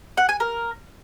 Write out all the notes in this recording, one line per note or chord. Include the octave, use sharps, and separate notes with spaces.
F#5
G#5
A#4